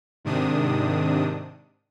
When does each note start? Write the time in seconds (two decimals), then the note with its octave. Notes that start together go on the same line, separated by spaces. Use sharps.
0.24 G#2 C3 D#3 D4 D#6